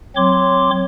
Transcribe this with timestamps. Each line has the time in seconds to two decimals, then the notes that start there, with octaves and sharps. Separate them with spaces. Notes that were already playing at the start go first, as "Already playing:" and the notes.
0.16 F#3 C4 C#5 C6 D6